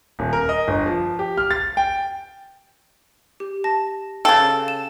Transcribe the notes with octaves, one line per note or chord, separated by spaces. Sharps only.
D#1
A#4
D#5
G1
F3
G4
F6
A6
G5
G4
A5 A#6
C#3 A4 F5 G5
E7